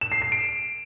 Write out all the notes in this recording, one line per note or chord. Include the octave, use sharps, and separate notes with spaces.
E7
C7
C7
D7